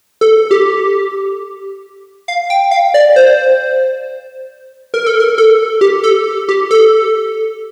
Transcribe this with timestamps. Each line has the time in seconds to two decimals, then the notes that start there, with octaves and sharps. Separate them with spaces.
0.21 A4
0.51 G4
2.28 F5
2.50 G5
2.71 F5
2.94 D5
3.16 C5
4.94 A#4
5.06 A4
5.20 A#4
5.38 A4
5.81 G4
6.03 A4
6.49 G4
6.71 A4